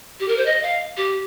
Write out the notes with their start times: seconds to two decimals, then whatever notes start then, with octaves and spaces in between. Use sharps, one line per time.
0.20 G4
0.28 A#4
0.37 C5
0.46 D#5
0.63 F5
0.97 G4